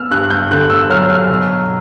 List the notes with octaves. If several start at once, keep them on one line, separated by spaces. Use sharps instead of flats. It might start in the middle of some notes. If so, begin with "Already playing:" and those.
Already playing: B3 E6 F6
G2 F#6
G6
D3 F#6
E6
F#3 F6
F6
B2